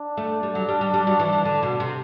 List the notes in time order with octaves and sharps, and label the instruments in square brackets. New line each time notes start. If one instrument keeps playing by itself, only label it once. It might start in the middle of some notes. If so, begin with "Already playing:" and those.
Already playing: [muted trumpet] D4
[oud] A3
G3
F#3
G3
G3
G3
F#3
E3
E3
D3
B2
C3